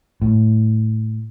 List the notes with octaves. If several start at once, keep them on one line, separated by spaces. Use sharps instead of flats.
A2